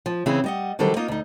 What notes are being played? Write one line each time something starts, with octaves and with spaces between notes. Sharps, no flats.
F3
C#3 E3 C4 C#4 E4 G#4
G3 D#5 F#5
D3 D#3 F#3 G3 A4 C5
A#3 D#4 F4 D#5
D2 D#4